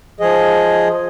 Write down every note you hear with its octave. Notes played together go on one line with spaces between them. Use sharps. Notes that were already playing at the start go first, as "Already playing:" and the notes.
F3 G#4 D#5